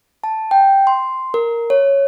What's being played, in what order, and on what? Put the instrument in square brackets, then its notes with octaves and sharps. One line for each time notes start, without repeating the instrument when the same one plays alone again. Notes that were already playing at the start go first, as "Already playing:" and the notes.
[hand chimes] A5
G5
C6
A#4
C#5